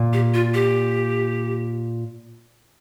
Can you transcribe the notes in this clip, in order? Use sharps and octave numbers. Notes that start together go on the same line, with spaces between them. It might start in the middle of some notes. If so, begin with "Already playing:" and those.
Already playing: A#2
G4
F4
G4